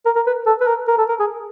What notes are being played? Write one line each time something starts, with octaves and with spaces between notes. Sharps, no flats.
A#4
A#4
B4
A4
B4
A#4
A#4
A4
A#4
G#4